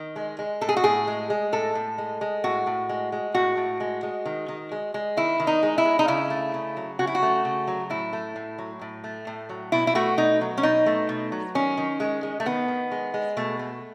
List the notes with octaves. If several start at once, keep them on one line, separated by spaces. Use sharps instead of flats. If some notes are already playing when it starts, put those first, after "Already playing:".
Already playing: D#3
G#3
G#3
A2 A4
G#4
F#4
A2 G#4
G#3
G#3
A2 A4
A2
G#3
G#3
A2 F#4
A2
G#3
G#3
A2 F#4
A2
G#3
G#3
D#3
D#3
G#3
G#3
D#3 E4
D#3
D#4
G#3
E4
G#3
D#4
C#3 E4
A3
C#3
F#3
C#3 F#4
E4
F#4
A3
C#3
F#3
A2 E4
A3
A2
F#3
A2
A3
A2
F#3
B2 E4
E4
A3 F#4
B2 D#4
F#3
C#4
B2 D#4
A3
B2
F#3
D#3 C#4
D#3
G#3
G#3
A3
D#3 B3
D#3
G#3
G#3
B2 A3
A3